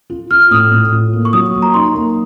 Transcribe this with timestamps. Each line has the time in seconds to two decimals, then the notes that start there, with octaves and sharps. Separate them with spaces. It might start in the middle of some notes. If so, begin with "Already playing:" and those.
0.10 F4
0.31 F4 F6
0.51 A2 D#6
0.71 A2
0.92 F4
1.13 A#3
1.25 C#6
1.33 F#3 D#6
1.54 A#3
1.62 A#5
1.74 D#4 C6
1.95 A#3